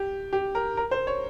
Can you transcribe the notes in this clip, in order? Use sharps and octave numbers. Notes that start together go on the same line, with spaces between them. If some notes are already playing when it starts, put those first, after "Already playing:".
Already playing: G4
G4
A#4
A#4
C5
C#5